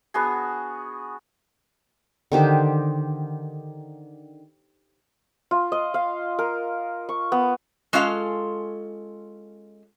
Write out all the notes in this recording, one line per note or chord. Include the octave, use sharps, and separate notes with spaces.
B3 D4 F#4 G#4
D3 D#3 G4 C5
F4
D#5
F5
A#4
C#6
B3
G#3 C#4 F4 A4 F5